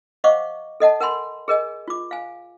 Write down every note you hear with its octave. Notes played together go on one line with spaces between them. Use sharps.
C5 D#5 F5 F#5 C#6 D6
A4 D#5 F#5 A5
A#4 F#5 G#5 B5 C6
G#4 A#4 D#5 G#5
F4 D6
F5 G#5